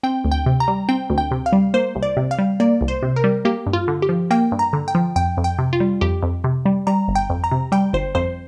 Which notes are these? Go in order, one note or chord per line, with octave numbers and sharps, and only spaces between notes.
C4 G5
D2
G5
C3
A#5
G3
C4 G5
D2
G5
C3
F5
G3
A#3 C5
C2
D5
C3
F5
G3
A#3 D5
C2
C5
C3
A#4
G3
A#3 G4
G2
F4
D3
G4
F3
A#3 G5
G2
A#5
D3
G5
F3
F2 G5
F2
G5
C3
F4
G3
F2 G4
F2
C3
G3
G3 A#5
G1
G5
F2
A#5
C3
G3 G5
G1 C5
F2 C5